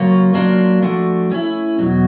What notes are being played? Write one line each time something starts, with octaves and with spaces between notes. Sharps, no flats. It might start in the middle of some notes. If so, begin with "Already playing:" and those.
Already playing: C#3 F#3 A#3 C#4 F4
F#3 A#3 D4 F4
F3 A3 D4 F#4
A3 C#4 E4
E2 B2 F#3